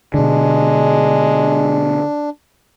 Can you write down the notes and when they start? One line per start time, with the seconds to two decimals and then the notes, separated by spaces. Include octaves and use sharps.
0.14 B2 D3 G#3 D4